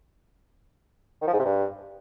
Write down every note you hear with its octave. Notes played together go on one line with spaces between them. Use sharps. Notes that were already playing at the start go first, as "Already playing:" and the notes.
D#3
F3
G#2
C3
G2